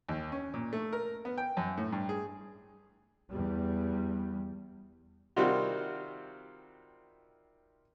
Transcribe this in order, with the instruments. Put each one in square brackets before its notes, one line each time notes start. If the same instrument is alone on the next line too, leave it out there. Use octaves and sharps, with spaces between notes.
[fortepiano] D#2
C#4
A#2
A3
A#4
B3
G5
F#2
A2
G2
G#4
[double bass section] E2 G3
[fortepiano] C3 D#3 G3 C4 F4 F#4